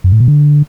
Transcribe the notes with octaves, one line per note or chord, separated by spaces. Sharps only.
F#2
A2
B2
D3